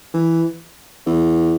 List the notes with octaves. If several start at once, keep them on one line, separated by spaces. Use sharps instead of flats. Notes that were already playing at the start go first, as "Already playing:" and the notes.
E3
E2